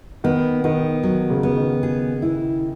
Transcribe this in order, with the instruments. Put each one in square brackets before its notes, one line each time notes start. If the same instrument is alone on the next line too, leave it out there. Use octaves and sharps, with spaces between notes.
[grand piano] D#3 [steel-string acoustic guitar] B3
[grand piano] D#3 [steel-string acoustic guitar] B3
[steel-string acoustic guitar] F#3
[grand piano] C#3
[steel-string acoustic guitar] B3
[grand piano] D#3
[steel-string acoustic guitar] G#4
E4